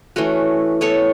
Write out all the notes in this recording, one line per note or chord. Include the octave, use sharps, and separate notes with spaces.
E3 A3 C#4 F#4
B3 E4 A4 C#5